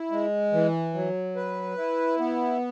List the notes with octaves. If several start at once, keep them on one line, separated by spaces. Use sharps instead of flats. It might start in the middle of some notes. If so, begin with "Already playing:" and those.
Already playing: E4
G#3
E3
F#3
B4
E4
B3